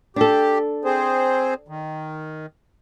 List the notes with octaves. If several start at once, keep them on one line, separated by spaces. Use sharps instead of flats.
D4 G4 A4
C4 G#4 C5
D#3